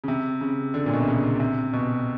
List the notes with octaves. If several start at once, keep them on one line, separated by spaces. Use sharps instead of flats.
C#3
C3
C#3
D3
A#2
B2
C3
C#3
C3
B2